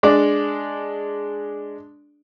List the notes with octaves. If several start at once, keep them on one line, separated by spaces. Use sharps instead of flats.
G#3 D4 D5